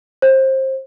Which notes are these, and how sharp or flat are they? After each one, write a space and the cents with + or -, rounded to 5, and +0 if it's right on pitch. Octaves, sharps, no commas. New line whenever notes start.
C5 +25